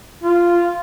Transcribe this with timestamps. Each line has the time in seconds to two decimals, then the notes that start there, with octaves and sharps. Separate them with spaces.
0.24 F4